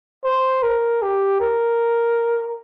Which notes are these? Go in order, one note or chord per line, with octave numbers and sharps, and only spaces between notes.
C5
A#4
G4
A#4